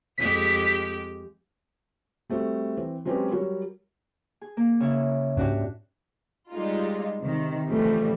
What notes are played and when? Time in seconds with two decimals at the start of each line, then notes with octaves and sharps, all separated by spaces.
0.18 F2 G#3 G4 B6
2.29 G3 A3 C4 F#4
2.77 E3 C4
3.05 F#3 G#3 C4 C#4 G4 B4
3.31 F#3 G3 F#4 A#4 C#5
4.41 G#4
4.57 A#3
4.80 C#3 E4
5.37 G#2 C#4 D4 F#4 G4
6.51 G3 G#3 D#4 F4
7.21 C3 D#3
7.69 A2 C#3 E3 F3 G3 A3